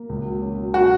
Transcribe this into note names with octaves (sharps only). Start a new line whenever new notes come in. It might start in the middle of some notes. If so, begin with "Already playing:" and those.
Already playing: A#3
C#2
F#3
C#4
B2
F#4